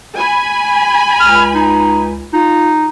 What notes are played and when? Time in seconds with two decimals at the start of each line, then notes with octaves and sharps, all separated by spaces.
0.17 G#5 B5
1.20 C#2 F6
1.54 D#4
2.33 D#4 F4